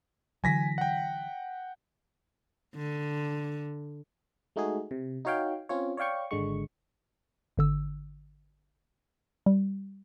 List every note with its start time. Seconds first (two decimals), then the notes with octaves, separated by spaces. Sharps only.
0.44 D3 E3 F#3 G#5 A#6 B6
0.78 F#5 G5
2.76 D3
4.56 G#3 A3 D#4 F#4 G#4
4.91 C3
5.25 D#4 F#4 C#5 F5 G5
5.69 C4 C#4 F4 C#5
5.97 C#5 D5 F5 G5 C#6
6.31 G#1 D3 G#3 C#6
7.57 G#1 D3 E6
9.46 G3